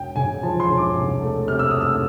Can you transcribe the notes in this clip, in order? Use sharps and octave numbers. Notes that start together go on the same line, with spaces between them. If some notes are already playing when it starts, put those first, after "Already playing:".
Already playing: E1 G5
E1 G#5
F3 A5
C6
E1
D6
C2
A3
C3 F6
E6
A3 D#6
E6